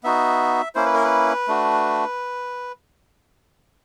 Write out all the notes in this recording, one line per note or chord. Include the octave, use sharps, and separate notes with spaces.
B3 D#4 F#4 E5
A#3 C#4 E4 C5
B4
A#4
B4
A3 D4 F#4